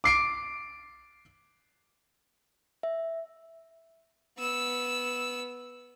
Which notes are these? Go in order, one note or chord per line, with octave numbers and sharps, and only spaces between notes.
D6 C7 D7
E5
B3 E6